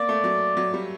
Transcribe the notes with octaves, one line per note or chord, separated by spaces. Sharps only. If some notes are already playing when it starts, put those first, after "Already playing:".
Already playing: A#3 D5
A3
F#3
F#3
G3